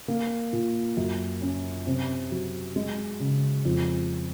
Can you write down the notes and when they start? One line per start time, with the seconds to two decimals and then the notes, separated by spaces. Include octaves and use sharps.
0.08 A#3
0.53 A#2
0.97 F#2
1.42 C#4
1.87 C3
2.32 F#3
2.76 G#3
3.20 C#3
3.65 F2